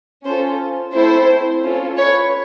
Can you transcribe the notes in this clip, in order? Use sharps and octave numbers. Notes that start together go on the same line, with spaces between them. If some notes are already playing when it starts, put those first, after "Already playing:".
C#4 F4 A4 C5
A3 C4 E4 A4 C5
C#4 F4 A4
B4 C#5